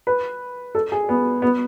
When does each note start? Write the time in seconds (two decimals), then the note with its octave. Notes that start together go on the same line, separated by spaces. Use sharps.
0.07 B4
0.75 A4
0.92 G#4
1.09 B3
1.42 B3